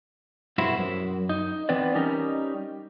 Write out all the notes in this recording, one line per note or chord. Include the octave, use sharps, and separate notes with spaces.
B1 G2 E4 F#4 C5
F#2
D#4
E3 B3 C4 B4 D5
G3 C#4 D#4 A#4